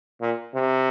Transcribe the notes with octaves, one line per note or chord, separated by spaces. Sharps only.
A#2
C3